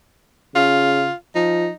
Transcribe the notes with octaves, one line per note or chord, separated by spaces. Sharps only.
C#3 F4
F3 D#4